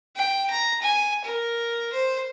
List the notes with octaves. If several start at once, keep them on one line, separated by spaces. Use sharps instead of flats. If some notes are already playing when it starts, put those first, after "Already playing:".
G5
A#5
G#5
A#4
C5